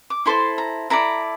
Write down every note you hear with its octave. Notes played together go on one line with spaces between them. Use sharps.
D6
E4 A4 C5 C6
A#5
E4 A4 D5 A#5